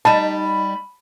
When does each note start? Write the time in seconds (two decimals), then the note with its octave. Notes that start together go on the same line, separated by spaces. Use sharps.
0.05 G3 D#4 A5 B5